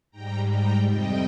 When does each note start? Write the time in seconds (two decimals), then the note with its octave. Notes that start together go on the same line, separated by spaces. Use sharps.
0.11 G#2 G3 G5 A#5
0.49 G5 A#5
0.87 F2 C3 G3 D#5 G5